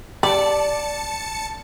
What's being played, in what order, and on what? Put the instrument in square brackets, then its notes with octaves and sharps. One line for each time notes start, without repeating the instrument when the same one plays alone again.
[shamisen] G3 [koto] D5 [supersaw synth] A5 C#7